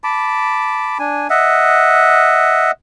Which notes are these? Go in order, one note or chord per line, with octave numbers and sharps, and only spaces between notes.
A5 B5 D6
D4 G#5
D#5 E5 F#5